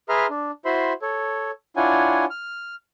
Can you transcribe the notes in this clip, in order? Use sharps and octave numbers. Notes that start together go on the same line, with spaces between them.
G#4 B4 E5 A#5 C6 F6
D4
E4 F#4 C5 E5 B5 C6
A4 C#5
D4 E4 F4 C#5 F#5 G#5
F6